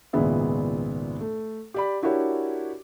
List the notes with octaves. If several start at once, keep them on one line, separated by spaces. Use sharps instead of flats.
G#1 C#2 A#2 G#3 B3 E5
A3
G4 D5 B5
D4 E4 F#4 G4 A#4 C#5